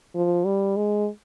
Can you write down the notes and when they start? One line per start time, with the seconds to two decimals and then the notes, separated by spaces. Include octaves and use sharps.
0.15 F3
0.46 G3
0.76 G#3